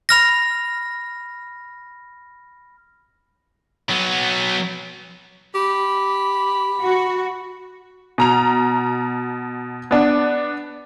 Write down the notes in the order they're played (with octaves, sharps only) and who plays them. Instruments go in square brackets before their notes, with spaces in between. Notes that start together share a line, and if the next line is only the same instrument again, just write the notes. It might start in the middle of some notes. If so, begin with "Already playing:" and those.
[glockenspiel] B5 F6 A#6
[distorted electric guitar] F#3 B3
[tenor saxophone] G4 [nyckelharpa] B5
[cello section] F#4
[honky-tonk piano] B2 A#5 F7
B3 D4